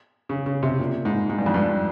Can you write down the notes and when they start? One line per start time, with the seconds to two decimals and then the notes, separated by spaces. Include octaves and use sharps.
0.29 C#3
0.46 C#3
0.63 C3
0.79 A#2
1.05 G#2
1.29 G#2
1.39 G2
1.46 F2
1.54 G2